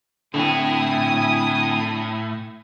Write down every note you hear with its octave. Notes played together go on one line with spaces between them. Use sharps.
A2 D3 C4 E4 G#5 D#6